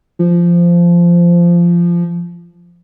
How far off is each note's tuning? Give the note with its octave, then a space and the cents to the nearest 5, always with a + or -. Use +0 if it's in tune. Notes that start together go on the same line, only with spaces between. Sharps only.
F3 -15